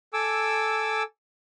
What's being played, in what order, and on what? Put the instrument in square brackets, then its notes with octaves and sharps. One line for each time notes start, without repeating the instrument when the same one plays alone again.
[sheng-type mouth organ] A4 G#5 D6 E6